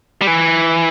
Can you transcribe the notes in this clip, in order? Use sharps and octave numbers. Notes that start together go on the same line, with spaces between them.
G3
E3